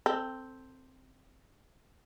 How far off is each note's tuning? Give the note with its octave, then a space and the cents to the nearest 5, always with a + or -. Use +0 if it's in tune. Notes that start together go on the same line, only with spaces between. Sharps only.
C4 +0 A4 +15